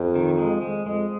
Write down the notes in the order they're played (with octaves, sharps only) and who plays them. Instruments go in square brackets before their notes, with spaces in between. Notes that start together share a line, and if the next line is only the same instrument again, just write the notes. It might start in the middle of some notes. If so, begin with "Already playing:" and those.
Already playing: [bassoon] F2
[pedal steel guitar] D#3
G#3
G#3
[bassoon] F2 [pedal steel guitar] G#3